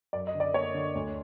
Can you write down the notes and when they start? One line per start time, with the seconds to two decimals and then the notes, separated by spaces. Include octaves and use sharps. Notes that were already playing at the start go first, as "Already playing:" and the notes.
0.13 F#2 D5
0.27 D#5
0.35 D3
0.40 D5
0.54 A#3 C#5
0.74 D3
0.95 D2